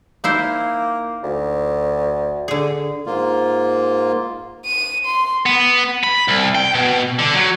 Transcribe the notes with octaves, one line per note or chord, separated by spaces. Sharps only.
A#3 D#4 E4 C5
D2
D3 G#4
G#2 A#3 F4
D#7
C6
B3
B5
C2
G5
B2
D3
F#3